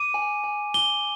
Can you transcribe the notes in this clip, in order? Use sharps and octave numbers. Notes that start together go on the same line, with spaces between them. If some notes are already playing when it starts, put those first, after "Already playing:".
Already playing: D6 D#7
G#5
G#5
D6 G7